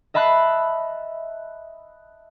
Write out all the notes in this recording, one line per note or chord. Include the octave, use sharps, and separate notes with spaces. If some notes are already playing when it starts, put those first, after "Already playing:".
D#5 E5 A5 B5 F#6 C7